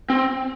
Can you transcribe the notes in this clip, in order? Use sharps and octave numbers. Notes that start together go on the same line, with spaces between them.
C4